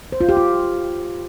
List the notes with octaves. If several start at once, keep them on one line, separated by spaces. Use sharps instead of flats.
C5
F4
G4
F4